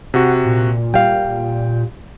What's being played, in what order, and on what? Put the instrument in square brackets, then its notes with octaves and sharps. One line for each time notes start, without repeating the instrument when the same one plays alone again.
[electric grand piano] C3 F#4 [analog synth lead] F#5
[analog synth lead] A#2
[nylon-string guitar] G3 F5 [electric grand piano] G5